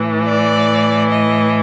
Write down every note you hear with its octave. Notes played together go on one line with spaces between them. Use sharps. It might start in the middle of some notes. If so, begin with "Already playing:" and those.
Already playing: A2 E3
D5
D#5